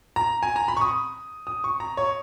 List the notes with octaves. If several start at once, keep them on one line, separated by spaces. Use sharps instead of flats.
A#5
G#5
A#5
B5
C#6
D#6
D#6
C#6
A#5
C#5